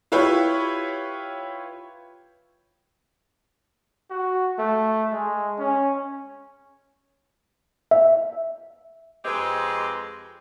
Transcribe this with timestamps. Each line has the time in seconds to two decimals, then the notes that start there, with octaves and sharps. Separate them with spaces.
0.12 E4 F4 G4 B4 C#5
4.10 F#4
4.59 A3
5.12 G#3
5.59 C#4
7.91 E5
9.25 F2 G#3 C4 G4 B4 D#5